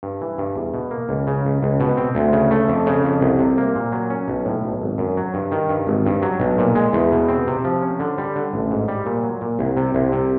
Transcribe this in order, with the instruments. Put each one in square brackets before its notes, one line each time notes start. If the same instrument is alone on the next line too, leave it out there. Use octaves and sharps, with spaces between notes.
[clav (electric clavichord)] G2
E3
G2
E2
B2
A#3
C#2
C#3
C#2
C#2
B2
C4
D2
C#3
A3
F2
C#3
F2
C2
C3
A#3
A#2
F#3
C#4
B1
A2
B1
G#1
F#2
F#3
G2
D#3
G2
G#1
G2
F#3
B1
A#2
G#3
E2
B2
C4
C3
F3
C#4
D3
G3
D3
A1
G#2
G3
A#2
F#3
A#2
C2
C3
C2
C3